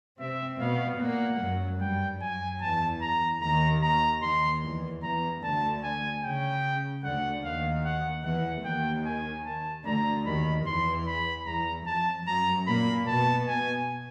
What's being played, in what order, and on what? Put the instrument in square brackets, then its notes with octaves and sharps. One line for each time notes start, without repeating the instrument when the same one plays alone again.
[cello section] C3 C4 [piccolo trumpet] E5
[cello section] B2 B3 [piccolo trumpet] F5
[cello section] A#2 A#3 [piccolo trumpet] F#5
[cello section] F#2 F#3
[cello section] G2 G3 [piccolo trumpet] G5
[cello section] F#2 F#3 [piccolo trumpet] G#5
[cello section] E2 E3 [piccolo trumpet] A5
[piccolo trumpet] A#5
[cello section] D#2 D#3 [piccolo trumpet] A#5
[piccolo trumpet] A#5
[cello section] D#2 D#3 [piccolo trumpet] C6
[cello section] E2 E3
[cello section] E2 E3 [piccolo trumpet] A#5
[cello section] D2 D3 [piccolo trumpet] A5
[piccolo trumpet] G#5
[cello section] C#3 [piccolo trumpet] G5
[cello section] D2 D3 [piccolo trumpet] F#5
[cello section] D#2 D#3 [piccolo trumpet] F5
[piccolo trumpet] F#5
[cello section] E2 E3 [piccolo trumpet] F#5
[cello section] D#2 D#3 [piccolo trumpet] G5
[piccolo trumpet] G#5
A5
[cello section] D2 D3 [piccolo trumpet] A#5
[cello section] D#2 D#3 [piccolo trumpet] B5
[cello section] E2 E3 [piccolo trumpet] C6
[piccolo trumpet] B5
[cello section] E2 E3 [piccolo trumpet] A#5
[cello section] F2 F3 [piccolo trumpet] A5
[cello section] F#2 F#3 [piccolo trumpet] A#5
[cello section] A#2 A#3 [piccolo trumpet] B5
[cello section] B2 B3 [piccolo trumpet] A5
[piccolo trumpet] G#5